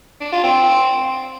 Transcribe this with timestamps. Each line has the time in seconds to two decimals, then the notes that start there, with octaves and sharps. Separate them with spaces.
0.21 D4
0.32 F4
0.44 C4